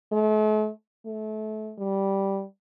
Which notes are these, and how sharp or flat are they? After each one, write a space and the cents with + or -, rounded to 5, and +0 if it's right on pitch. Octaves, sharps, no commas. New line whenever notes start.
A3 -45
A3 -30
G3 -5